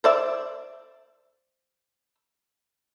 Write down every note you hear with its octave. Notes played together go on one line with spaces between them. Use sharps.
C5 D5 E5